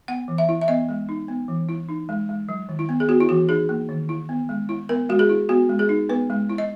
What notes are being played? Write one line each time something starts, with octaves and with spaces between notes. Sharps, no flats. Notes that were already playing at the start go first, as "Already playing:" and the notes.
B3 F#5
E3
E5
E4
E5
B3 D#5
G#3
D#4
B3
E3
E4
D#4
G#3
G#3
F#3
D#3
E4
B3
G#4
B3 F#4
E4
E3 F#4
D#4 G#4
A#3
D#3
E4
B3
G#3
E4
B3 A#4
G#3 F#4
G#4
E4
B3 F#4
G#3
G#4
D#4
B3 B4
G#3
E4
D#5